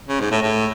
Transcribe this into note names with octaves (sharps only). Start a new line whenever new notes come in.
C#3
G#2
A2
A2